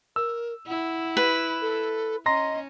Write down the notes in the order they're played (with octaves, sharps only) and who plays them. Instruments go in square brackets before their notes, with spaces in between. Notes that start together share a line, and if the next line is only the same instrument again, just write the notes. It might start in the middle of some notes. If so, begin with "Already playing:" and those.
[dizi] A#4 [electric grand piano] E6
[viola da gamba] E4 [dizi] F#5
[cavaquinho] B4
[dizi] A4
[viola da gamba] C#4 [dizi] D#5 [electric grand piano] A#5 C6 A#6